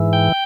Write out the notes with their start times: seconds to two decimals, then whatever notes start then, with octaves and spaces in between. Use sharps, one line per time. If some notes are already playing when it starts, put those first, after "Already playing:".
Already playing: G#2 E3
0.13 G5